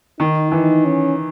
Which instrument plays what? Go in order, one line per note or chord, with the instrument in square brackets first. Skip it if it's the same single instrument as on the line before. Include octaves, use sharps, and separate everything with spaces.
[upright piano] D#3 [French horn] D#4
[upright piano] E3 [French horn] D#4
[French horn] C#4